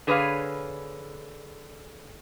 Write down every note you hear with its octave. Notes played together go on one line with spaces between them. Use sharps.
D3 G#4 B4 C#5 D#5 F5